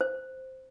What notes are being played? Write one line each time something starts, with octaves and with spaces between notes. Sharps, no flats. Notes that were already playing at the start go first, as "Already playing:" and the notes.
C5